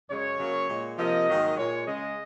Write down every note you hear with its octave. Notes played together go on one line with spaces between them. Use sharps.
F#2 C#3 G#3 C#5
C#3 F#3 A#3
A#2 G#3
C3 F3 A#3 D#5
G#2 D#3 F#3 A#3
A#2 G#3 C#5
C#3 G#3 D#5